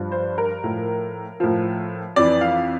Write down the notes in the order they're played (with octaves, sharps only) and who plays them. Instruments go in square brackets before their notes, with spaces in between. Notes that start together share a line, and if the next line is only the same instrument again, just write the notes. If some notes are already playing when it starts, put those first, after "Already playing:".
Already playing: [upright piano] G2 F3
C5
A#4
A2 F3
A2 F3
F2 E3 D5
F5